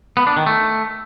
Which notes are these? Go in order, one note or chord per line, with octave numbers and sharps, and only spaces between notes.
B3
D4
D#3
A3